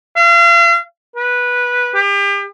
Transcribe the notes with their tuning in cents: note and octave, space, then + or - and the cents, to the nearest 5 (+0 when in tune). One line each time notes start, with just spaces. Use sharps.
F5 -40
B4 -10
G4 +35